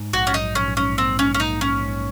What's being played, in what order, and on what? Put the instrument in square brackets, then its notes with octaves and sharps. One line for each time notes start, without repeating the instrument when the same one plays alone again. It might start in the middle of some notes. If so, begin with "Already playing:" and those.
Already playing: [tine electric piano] G#2
[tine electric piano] A#1 [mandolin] F#4
[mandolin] C#4
[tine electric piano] F#3 [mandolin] D#4
[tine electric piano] A#1 [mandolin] C#4
[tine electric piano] G#2 [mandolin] C#4
[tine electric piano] A#3 [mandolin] C4
[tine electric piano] G#2 [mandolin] C#4
[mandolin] C#4
[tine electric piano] A#3 [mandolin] D#4
[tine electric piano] G#2 [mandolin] C#4
[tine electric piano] G#2